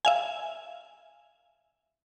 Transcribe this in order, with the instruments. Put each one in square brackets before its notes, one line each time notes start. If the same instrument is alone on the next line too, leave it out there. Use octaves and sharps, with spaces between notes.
[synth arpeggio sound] E5 F5 G#5